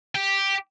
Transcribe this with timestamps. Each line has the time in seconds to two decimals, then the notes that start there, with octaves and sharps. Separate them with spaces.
0.15 G4